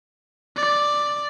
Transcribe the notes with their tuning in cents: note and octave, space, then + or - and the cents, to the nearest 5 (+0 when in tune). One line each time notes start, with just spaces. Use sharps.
D5 +5